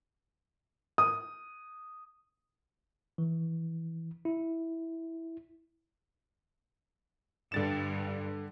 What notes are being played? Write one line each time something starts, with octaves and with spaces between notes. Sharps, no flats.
D#6
E3
E4
G2 D3 A6 E7